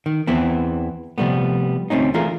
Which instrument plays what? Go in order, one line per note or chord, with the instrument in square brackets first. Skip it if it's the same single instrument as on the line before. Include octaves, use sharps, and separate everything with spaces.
[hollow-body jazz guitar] D#3
E2 E3 B3 C4
C3 F3 G3 A3 B3
D2 A3 C4 C#4 D#4
E3 A3 F4 G#4 A#4